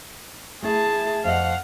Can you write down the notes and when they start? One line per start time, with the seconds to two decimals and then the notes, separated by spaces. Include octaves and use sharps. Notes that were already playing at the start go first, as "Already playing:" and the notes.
0.62 A3 E4 G#4 A5
1.24 F2 D#5 F5 F#5